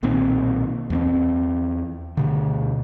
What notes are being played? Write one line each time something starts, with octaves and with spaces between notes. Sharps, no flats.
B1 A#2 D#3 C4
E2 B3 C4
D2 B2 D3